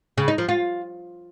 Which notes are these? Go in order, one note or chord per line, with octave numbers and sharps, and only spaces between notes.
C#3
D#4
F3
F4